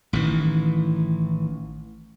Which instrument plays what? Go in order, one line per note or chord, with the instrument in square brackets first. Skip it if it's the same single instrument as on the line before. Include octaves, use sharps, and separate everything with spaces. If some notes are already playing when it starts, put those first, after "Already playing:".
[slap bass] A1 D#3 E3